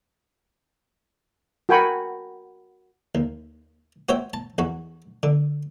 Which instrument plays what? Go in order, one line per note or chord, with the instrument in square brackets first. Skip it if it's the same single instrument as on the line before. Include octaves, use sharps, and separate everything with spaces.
[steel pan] F#4 A#4 G5 G#5 B5 C#6
[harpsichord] D#2
F#4 C5 C#5 E5 G5
A5
E2 F#4
D3